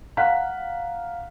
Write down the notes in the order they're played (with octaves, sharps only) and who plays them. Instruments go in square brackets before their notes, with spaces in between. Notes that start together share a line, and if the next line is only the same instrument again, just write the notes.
[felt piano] F5 F#5 A#5 F#6 B6